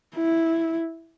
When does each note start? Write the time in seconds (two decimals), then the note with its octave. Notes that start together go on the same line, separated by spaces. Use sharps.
0.16 E4